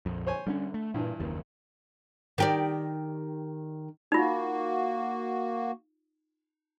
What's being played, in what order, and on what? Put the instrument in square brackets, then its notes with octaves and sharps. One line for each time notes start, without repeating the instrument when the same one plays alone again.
[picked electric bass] A#1 F2
[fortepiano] C5 C#5 G#5
[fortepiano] D3 [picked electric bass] G3 A3 C#4
[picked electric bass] A3
[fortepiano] G2 E3 D4 [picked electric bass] A#2
[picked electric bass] F#1 D#2
[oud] D#3 G4 D5
[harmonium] A#3 F#4 [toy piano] D#4 F4